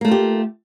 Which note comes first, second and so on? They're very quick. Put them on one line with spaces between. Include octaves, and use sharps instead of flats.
A#3 A3 F4 G4